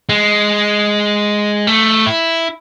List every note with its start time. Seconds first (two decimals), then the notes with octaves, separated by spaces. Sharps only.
0.09 G#3
1.67 A3
2.06 E4